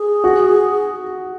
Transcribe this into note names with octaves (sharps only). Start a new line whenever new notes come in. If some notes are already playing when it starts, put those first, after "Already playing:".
Already playing: G#4
F#4